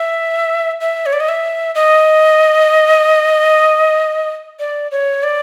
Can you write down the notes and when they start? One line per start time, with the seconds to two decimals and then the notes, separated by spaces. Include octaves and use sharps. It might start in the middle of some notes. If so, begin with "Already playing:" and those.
Already playing: E5
0.81 E5
1.06 C#5
1.13 D5
1.20 D#5
1.29 E5
1.75 D#5
4.59 D5
4.91 C#5
5.23 D5